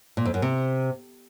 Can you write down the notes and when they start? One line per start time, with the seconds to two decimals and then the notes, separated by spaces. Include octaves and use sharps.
0.17 A#2
0.25 F2
0.34 F#2
0.42 C3